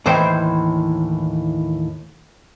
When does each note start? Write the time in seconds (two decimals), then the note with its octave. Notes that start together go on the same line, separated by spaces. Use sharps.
0.06 D#2 A2 E3 C5 E5 G5